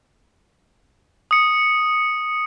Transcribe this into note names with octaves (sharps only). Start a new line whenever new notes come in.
D#6 C#7